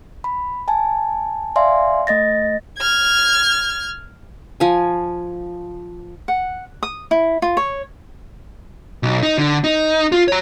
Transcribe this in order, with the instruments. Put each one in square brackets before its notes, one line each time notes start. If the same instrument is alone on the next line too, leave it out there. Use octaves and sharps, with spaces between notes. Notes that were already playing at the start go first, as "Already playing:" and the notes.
[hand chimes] B5
G#5 A5
D5 E5 F5 G#5 C6
A3 D#5 A6 A#6
[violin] F6 G#6
[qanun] F3 G#5
[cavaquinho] F#5
D#6
E4
F4
C#5
[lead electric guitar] B1
D#4
D3
D#4
F4
C#5 A#5